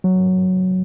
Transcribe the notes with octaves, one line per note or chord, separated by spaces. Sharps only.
F#3